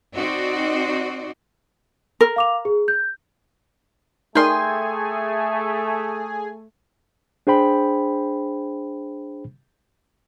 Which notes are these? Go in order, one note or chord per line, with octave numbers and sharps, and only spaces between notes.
C4 D#4 F#4 D5
A#4
F5 D6 F7
G#4
G6
A3 D#4 G#4 A#4 D5 G5 G#5 C6
D4 G#4 C5 G5 B5